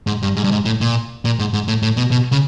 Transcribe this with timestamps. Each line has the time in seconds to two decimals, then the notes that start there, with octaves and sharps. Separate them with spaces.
0.07 G#2
0.23 G2
0.37 G#2
0.44 G2
0.52 G#2
0.65 A2
0.81 A#2
1.25 A#2
1.39 G#2
1.54 G#2
1.68 A2
1.83 A2
1.97 B2
2.12 B2
2.32 C#3